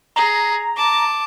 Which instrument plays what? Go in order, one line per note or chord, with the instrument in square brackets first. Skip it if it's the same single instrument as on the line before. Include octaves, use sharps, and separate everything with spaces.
[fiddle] G#4 [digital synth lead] A#5
[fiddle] A5 D6